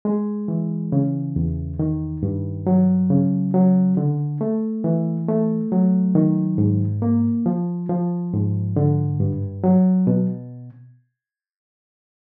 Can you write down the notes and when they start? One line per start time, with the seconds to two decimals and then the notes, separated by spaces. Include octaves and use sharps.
0.05 G#3
0.48 E3
0.92 C#3
1.36 E2
1.79 D#3
2.23 G2
2.67 F#3
3.10 C#3
3.54 F#3
3.97 D3
4.41 A3
4.84 E3
5.28 A3
5.72 F#3
6.15 D#3
6.58 G#2
7.02 A#3
7.46 F3
7.89 F3
8.33 G#2
8.76 D3
9.20 G2
9.64 F#3
10.07 B2